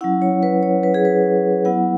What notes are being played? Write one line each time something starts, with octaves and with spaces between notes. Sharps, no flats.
F#3 C#4 E4 F#5
C#5
B4
C#5
B4
G#4
B4
F#3 B3 E4 F#5